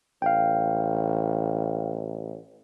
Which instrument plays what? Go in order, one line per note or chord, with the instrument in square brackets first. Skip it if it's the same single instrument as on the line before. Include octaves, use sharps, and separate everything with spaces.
[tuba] A1 [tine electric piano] F5 G5